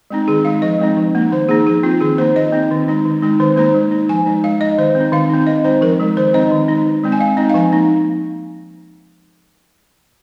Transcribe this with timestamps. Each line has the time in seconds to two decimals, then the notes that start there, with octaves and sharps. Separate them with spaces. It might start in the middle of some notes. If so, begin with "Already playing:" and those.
0.10 G#3 C4 D#4
0.28 D#3 G#4
0.45 G#3 D#4 F5
0.62 F3 D#5
0.79 G#3 C4 D#4
0.97 F3
1.15 A#3 D#4
1.32 D#3 C5
1.49 A#3 D#4 G#4
1.67 F3 G#4
1.83 C4 D#4 F4
2.00 D#3 G#4
2.18 A#3 D#4 C5
2.36 D#3 D#5
2.52 C4 D#4
2.71 D#3
2.88 G#3 D#4
3.05 D#3
3.22 G#3 C4 D#4
3.40 D#3 C5
3.56 A#3 D#4 C5
3.75 G#3
3.91 D#4
4.09 F3 G#5
4.26 G#3 D#4
4.44 G#3 F5
4.61 D#4 D#5
4.78 D#3 C5
4.95 C4
5.00 D#4
5.12 D#3 F5
5.30 C4 D#4
5.47 D#3 D#5
5.64 G#3 C4 D#4 C5
5.81 F3 A#4
6.00 G#3 D#4
6.17 D#3 C5
6.33 C4 D#4 D#5
6.51 D#3
6.68 G#3 D#4
6.86 D#3
7.04 G#3 C4
7.12 G#5
7.20 G#3 F5
7.37 C4 D#4 D#5
7.49 F5
7.54 F3 G#5
7.72 A#3 D#4